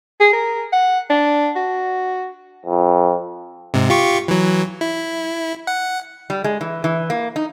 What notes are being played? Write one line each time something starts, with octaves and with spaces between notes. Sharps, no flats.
G#4
A#4
F#5
D4
F#4
F2
G#2 C3
F4 G4 C#6
E3 F#3
E4
F#5
G3
G#3
E3
E3
A#3
D#4